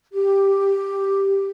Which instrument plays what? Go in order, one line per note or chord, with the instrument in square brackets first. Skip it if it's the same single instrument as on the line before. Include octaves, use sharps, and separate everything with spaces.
[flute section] G4